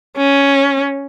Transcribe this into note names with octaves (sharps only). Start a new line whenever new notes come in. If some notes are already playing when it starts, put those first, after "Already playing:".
C#4